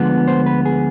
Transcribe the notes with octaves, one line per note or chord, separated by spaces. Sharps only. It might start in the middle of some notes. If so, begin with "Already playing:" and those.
Already playing: D2 D3 F3 G#3 B3
C5
B4
G#4